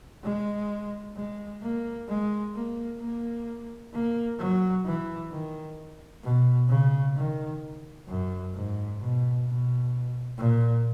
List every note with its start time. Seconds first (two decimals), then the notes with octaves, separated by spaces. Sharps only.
0.24 G#3
1.16 G#3
1.62 A#3
2.09 G#3
2.55 A#3
3.01 A#3
3.93 A#3
4.39 F#3
4.86 E3
5.31 D#3
6.24 B2
6.69 C#3
7.16 D#3
8.08 F#2
8.54 G#2
9.00 B2
9.46 B2
10.38 A#2